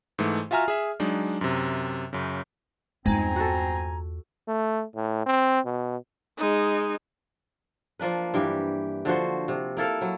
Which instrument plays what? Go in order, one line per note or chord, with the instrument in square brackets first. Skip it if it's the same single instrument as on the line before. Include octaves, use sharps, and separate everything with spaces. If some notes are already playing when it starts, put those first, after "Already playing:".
[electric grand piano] G#2 E3 A3
F4 F#4 E5 G#5 A#5 F6
G#4 E5
F#3 G#3 D4 D#4
F#2 C3
F#2 C#3
[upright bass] E2 F4 [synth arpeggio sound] G2 G#3 D#4 [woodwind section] C4 G#5 A#5
[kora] F#4 A4
[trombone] A3
A2
C4
B2
[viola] G#3 D#4
[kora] F3 A#3 D4 B4
G2 E3 G4
D3 F3 F#4 C5
C3
A#3 E4 A4 F5
F#3 E4